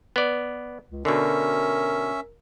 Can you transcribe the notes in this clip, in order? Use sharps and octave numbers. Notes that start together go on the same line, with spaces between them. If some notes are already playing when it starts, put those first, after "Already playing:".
B3 D5
C#2
B2 D3 C#4 A#4 E5